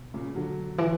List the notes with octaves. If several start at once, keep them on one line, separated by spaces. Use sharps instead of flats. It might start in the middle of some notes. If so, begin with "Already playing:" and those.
Already playing: B2
A#2 C#3
D3 F#3
E3